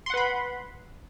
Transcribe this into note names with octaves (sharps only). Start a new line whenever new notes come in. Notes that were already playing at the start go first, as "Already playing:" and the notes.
B4 F#5 B5 C6